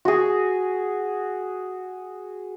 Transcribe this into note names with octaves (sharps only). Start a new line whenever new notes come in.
F#4 G#4